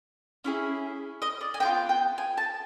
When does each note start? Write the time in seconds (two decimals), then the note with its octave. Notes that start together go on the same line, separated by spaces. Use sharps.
0.44 C#4 E4 G#4
1.22 D#5
1.41 D5
1.54 G#5
1.60 B3 D4 F4 G5
1.89 G5
2.18 G#5
2.38 A5